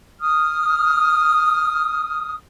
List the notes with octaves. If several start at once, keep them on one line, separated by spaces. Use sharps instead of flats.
D#6 F6